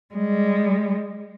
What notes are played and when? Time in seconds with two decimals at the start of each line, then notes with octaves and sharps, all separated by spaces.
0.15 G3 G#3